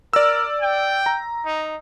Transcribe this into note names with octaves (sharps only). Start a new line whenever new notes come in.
A#4 D5 E6
G5
A#5
D#4